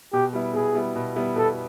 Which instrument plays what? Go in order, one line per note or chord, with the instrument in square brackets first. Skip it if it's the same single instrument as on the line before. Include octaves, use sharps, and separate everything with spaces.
[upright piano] B2 [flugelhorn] G4
[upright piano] G3 B3 E4
[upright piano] B2 [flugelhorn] G#4
[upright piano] G3 B3 E4
B2
G3 B3 E4
[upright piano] B2 [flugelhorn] A4